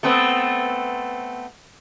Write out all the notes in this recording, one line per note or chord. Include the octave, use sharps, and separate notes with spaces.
A3 B3 C4